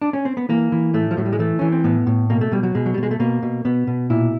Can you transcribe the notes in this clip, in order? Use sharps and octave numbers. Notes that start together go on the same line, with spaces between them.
D4
C#4
C4
B3
E3 A#3
E3
A2 A3
F3
A2 F#3
G3
G#3
E3 A3
E3 C#4
C4
A2 B3
A2
B2 A#3
A3
B2 G3
F#3
B2 G#3
F#3
G3
B2
G#3
A3
B2 A#3
B2
B2 B3
B2
A#2 E4